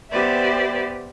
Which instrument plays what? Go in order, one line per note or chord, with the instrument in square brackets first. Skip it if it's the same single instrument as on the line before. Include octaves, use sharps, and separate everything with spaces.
[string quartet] B3 G4 B4 C5 D5 E5